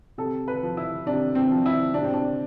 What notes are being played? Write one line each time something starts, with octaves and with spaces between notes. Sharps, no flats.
C3 A4
B4
F3
E4
C3 D4
C4
F3
E4
C3 D4
C4
D4